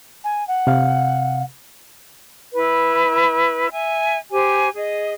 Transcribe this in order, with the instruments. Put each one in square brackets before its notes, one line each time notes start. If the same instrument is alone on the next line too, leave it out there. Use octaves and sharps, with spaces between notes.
[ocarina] G#5
F#5
[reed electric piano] C3 F5
[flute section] E4 B4
E5 G#5
G4 C5 G#5
G#4 D#5